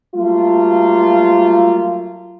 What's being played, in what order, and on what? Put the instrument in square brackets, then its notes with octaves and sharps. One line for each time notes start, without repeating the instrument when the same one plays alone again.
[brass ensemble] F#3 G3 A3 A#3 F4